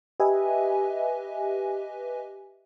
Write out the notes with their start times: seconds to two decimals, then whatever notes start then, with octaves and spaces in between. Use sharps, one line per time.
0.20 G4 B4 D#5 E5 G#5